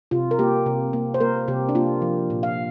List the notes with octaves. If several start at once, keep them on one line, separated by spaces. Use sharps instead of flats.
C3 F4
A#4
A#3 G4
C3
A#3
C5
A#3 A#4
C3 G4
D4
A#3 F4
F3
A#2
F5